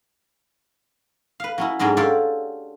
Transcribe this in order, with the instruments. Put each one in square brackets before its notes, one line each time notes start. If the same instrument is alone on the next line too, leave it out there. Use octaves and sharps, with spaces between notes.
[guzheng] B4 F5
F#3 C#4 E4
G#2 F#3 G3 C#4 D4 G#4
F4 G4 A4 C#5 D5